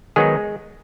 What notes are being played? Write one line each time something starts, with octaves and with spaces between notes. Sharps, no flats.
D#3 F#3 G#3 B3 D#4 G#4